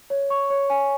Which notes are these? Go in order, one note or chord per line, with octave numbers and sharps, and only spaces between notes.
C#5
C#6
C#5
G#5